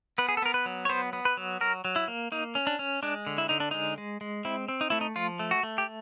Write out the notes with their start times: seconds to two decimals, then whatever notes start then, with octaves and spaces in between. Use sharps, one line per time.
0.18 B3 B4
0.29 G#4
0.37 A4
0.42 B3 A#4
0.54 B4
0.66 F#3
0.85 C#5
0.89 B3 C5
1.13 B3
1.25 B4
1.37 F#3
1.61 F#3 A#4
1.85 F#3
1.96 E4
2.08 A#3
2.32 A#3 D#4
2.55 C#4
2.67 D4
2.79 C#4
3.03 G#3 D4
3.27 D3
3.38 E4
3.49 D3 D#4
3.60 D4
3.71 G#3 D#4
3.98 G#3
4.21 G#3
4.45 C4 E4
4.68 C4
4.81 D#4
4.90 A3 E4
5.01 D#4
5.16 F3 F4
5.39 A3
5.51 F#4
5.63 A3
5.78 G4